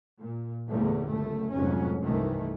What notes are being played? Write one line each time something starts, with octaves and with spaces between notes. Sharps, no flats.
A#2
G1 E2 A#2 G3 A3
C#2 F#2 A3
F1 F2 G#2 F#3 C#4
C2 G2 D#3 E3 A3